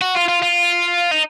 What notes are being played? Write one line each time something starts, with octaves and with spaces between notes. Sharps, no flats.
F#4
F4
F4
F4
D#4